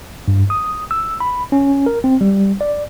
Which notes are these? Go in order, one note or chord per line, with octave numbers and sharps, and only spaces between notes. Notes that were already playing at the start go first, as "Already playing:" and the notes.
G2
D#6
E6
B5
C#4
A#4
C4
G3
D5